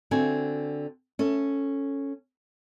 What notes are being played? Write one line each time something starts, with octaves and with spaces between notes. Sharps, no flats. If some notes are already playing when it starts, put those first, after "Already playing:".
D3 C4 F#4 G#5
C#4 A4